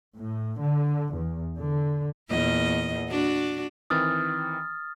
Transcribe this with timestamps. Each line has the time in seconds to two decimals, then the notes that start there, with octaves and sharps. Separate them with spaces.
0.16 A2
0.62 D3
1.14 E2
1.59 D3
2.30 E2 A#2 D#5
3.11 D4 F#4
3.90 D#3 E3 C4 D#6 F6 A6